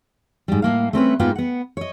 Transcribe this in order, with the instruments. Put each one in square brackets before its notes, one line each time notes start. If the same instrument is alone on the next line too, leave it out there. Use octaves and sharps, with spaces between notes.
[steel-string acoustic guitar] G#2 G3
A2 A#3 F5
A3 C4 C#4 B4
G#2 A#3 B3 F4 B4 G5
B3 F#5
C#5 D#5